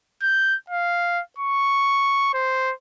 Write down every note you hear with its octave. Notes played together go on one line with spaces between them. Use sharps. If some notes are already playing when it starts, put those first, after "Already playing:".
G6
F5
C#6
C5